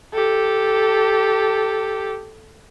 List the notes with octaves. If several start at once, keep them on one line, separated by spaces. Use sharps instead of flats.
G4 A4